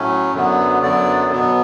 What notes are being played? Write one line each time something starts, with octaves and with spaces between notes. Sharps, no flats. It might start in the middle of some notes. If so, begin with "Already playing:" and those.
Already playing: A2 F#3 A3 C#4
F#2 D3 F#3 B3
F#2 D3 F#3 B3 D5
B2 F#3 B3